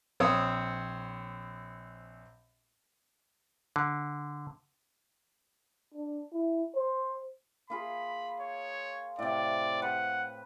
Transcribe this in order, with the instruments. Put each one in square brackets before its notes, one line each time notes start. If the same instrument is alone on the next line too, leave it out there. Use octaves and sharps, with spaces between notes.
[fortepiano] A#1 C4 C#5 D#6 E6
[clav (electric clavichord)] D3
[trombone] D4
E4
C5
[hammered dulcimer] A#3 F4 G#4 [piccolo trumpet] B5
[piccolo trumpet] C#5
[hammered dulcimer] A2 C3 [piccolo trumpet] D5
[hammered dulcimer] B4 [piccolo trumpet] F#5